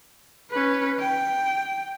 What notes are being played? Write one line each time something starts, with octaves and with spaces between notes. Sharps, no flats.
C#4 B4
G5